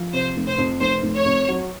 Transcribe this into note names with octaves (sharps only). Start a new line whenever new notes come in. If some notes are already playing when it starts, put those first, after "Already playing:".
Already playing: F3
C3 C5
F1
C5
F2
F1 C5
F1
C#5
F2
F#3